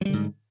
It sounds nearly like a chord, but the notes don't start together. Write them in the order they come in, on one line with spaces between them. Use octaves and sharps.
F#3 G3 D3 G#2